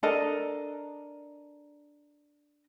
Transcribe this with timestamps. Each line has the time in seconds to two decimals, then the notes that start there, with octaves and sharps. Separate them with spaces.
0.03 D4 A4 A#4 D#5